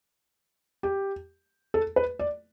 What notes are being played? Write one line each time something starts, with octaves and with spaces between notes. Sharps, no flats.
G4
A4
B4
D5